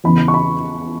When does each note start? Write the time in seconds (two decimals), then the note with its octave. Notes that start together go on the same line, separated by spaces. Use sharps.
0.04 E2 C#3 E3 B5
0.28 C#6
0.34 B5